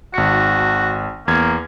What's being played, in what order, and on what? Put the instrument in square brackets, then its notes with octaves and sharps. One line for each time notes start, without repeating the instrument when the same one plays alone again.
[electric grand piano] G#1 C#7 [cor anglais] F#4
[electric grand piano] E2 G#6 [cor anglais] A#3